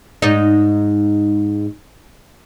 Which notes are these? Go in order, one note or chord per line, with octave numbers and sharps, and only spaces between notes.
G#2 D#4